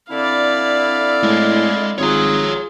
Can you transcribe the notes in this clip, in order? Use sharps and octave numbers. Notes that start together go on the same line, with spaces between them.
D3 C4 E4 D5 F5
A2 G#3
G#1 F4 G#4 C#5 A#5